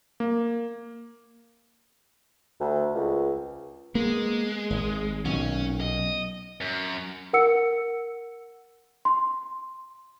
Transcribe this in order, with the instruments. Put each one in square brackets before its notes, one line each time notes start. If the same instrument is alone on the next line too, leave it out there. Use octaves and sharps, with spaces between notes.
[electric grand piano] A#3
[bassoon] D2
C#2
[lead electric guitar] G#3 [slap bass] A#3 B3
[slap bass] G#1
[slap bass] B1 A#2 [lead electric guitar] C#4
[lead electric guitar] D#5
[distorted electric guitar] F#2
[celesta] A#4 F#5 E6 C#7
C6